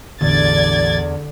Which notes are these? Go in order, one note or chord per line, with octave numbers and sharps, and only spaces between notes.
A1 E2 D3 D5 G#6 A6